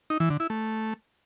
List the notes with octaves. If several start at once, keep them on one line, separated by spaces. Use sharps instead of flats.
D#4
E3
D3
E4
A3